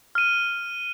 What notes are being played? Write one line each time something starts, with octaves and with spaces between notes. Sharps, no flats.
F6 D#7